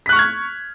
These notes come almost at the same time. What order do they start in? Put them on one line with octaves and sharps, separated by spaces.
B6 F#6 C#6 F6 G#6